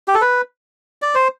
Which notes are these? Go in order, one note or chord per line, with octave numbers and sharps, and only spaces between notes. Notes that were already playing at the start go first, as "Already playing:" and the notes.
G4
A4
B4
D5
C5